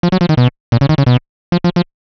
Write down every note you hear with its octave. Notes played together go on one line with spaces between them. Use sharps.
F3
F#3
F3
D#3
B2
A#2
C#3
D#3
C#3
B2
F3
F3
F3